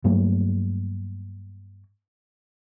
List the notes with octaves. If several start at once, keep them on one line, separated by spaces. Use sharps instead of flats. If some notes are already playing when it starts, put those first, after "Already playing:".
G2 F#3 A3 A#3